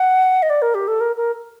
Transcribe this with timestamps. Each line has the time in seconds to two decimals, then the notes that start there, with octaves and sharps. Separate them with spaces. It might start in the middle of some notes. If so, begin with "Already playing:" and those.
Already playing: F#5
0.43 D#5
0.50 D5
0.62 A#4
0.75 G4
0.88 A4
1.01 A#4
1.16 A#4